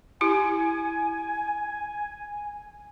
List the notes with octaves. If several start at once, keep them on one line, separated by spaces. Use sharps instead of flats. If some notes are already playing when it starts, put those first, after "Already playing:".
E4 G4 G#5